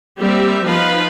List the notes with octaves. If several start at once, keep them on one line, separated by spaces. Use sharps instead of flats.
G3 A#3 C4 G4 E5
F3 B3 D#4 F4 B4 F5